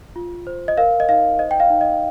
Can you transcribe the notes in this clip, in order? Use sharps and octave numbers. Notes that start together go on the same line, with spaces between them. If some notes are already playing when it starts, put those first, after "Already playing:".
F4
C5
D#5
A#4 F5
D#5
D#4 F5
C5 D#5
G5
F5
D#4
D#5